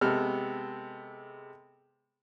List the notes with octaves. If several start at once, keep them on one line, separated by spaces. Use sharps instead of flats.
C3 G#3 B3 A4 F6